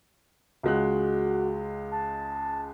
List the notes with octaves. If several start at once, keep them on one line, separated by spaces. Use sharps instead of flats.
C#2 G#3 F#4 F#6
A5